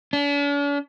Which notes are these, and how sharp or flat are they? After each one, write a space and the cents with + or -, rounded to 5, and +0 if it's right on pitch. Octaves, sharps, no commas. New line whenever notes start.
D4 -45